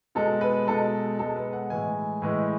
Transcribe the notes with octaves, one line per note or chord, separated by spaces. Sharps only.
B2 G#3 A4
B4
B2 G#3 A4
B2 G#3 A4
B4
F#5
A2 E3 G#3 G#5
A2 E3 G#3